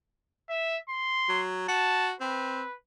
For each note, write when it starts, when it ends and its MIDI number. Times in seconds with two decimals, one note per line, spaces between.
0.49 0.77 76
0.89 1.42 84
1.29 1.64 54
1.68 2.13 66
1.68 2.11 81
2.20 2.63 60
2.20 2.74 71